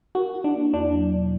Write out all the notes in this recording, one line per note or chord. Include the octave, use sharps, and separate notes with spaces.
F#4 A#4
E4
D4
A#3
E2 D4
F#3
B2